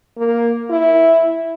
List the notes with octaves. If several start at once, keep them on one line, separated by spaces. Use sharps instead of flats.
A#3
E4